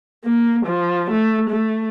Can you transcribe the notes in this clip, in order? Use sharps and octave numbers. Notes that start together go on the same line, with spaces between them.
A#3
F3
A3
A3